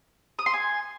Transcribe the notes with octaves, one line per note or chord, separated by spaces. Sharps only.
D#6
C6
G#5